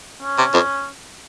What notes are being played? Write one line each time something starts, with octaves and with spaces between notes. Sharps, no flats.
C#4
C3
F2